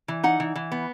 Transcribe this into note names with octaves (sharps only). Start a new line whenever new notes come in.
E3
D#4 F#5
E3
E3
B3